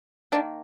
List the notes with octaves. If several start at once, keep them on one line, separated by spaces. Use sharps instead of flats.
D#3 A#3 D4